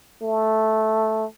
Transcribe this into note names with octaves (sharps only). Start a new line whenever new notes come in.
A3